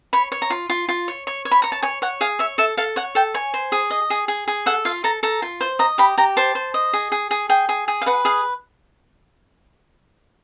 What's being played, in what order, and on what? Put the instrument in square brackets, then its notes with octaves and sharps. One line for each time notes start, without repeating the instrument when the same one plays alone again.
[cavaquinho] C#5 B5
C#5
A#5
F4
F4
F4
C#5
C#5
C#5
B5
C#5 A#5
A5
C#5 G#5
C#5 F#5
G#4 F5
C#5 E5
A4 E5
A4 F5
C#5 F#5
A4 G5
C#5 G#5
C5
G#4
D#5
G#4
G#4
G#4
A4 F#5
F4 F5
A4 A#5
A4 A#5
F4
C5
D#5 A#5
G4 B5
G4 A#5
C5 A5
C5
D#5
G#4
G#4
G#4
G#4 G5
G#4
G#4
F5
B4 F#5
G#4 F5